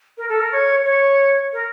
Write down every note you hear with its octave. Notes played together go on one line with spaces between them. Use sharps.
A#4
A4
A#4
C#5
C#5
A#4